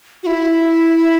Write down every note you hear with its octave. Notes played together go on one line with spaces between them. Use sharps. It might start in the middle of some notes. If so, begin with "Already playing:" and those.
F#4
E4